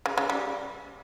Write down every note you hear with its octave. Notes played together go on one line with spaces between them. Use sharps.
C#3
C#3
G3